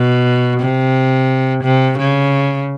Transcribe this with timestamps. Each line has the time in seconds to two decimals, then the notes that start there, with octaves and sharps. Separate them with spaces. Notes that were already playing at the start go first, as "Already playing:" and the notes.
Already playing: B2
0.60 C3
1.64 C3
1.98 C#3